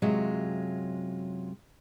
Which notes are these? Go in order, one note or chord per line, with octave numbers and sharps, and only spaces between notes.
F#2 C3 F#3 G#3 F4